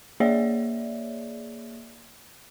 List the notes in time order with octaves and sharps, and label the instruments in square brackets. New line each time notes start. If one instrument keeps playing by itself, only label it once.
[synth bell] A#3 G#4 C#5 D5 E5